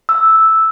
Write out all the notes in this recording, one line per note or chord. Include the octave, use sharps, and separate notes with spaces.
E6